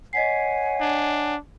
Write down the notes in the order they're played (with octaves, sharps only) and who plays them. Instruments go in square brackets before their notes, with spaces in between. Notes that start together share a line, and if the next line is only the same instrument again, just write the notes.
[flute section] C#5 F#5 G#5 [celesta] D#5 B6 C7
[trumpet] D4